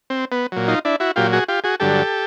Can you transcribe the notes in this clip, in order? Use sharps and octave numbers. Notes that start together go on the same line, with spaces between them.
C4
B3
A#2 F#3
D#4 F4
D4 E4
E4 F#4
A#2 F#3 F4 G4
F#4 G#4
F4 G4
F#4 G#4
G2 D3 F#3 G4 A4